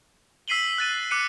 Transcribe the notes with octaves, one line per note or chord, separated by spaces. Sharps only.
E6 B6 C7 D#7 F#7 G7
F#6 A6 D#7
D6 F#6 C#7 D#7